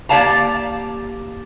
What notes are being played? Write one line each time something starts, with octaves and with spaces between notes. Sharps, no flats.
A#3 G4 D5 F5 A5 A#5